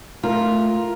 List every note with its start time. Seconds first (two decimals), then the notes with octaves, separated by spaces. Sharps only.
0.23 A3 F4 A#4